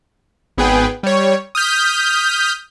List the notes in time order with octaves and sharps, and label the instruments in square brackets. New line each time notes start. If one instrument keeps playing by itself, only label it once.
[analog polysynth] G#1 B3 G#4 B4 G5
G3 C#5
D#6 F6 G6 B6